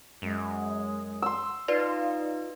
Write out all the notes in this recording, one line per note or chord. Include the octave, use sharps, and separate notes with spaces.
F#2 G#3
C6 E6
D#4 F4 B4 D5